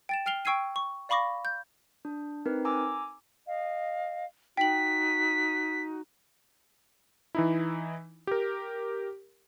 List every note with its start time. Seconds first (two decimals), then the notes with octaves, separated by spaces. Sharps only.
0.09 G5 A6 E7
0.26 G5 F6 C7 F7 G7
0.45 G5 C#6 E6 G#6 C7 D#7
0.76 C#6
1.09 D5 F5 B5 C#6 D6 A#6
1.45 G6
2.05 D4
2.46 C4 D#4 A#4 B4
2.65 G#5 A#5 D6 E6
3.47 D#5 F5
4.57 D#4 F#4 G5 B6 F#7
7.35 E3 D#4 E4
8.27 G4 A#4